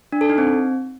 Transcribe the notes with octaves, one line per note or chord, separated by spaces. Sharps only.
D4
A4
D#4
C4